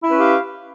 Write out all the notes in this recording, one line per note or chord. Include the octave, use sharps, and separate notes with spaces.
C#4 E4 G4 B4 F5